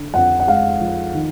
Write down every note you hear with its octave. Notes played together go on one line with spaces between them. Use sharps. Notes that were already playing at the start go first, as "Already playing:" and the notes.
Already playing: D3
F2 F#5
F#5
G#3 F5
F3
D#3